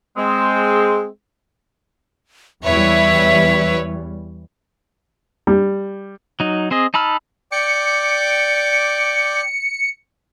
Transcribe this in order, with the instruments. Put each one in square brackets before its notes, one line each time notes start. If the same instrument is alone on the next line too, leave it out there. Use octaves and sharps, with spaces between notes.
[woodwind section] G#3 C4
[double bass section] E2 E3 G3 [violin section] E4 B4 C#5 [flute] E5
[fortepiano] G3
[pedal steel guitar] F#3 D#4
C4 G#4 D#5
D#4 A5 B5 E6 F6
[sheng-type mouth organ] D5 G5 D6 [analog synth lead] C#7